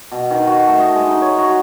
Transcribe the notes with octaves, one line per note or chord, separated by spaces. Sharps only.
B2
D#3
F#4
A3
D#5
G#3
D#4
C#5
F#4